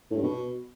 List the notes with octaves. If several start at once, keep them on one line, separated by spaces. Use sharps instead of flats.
A2
G2
B2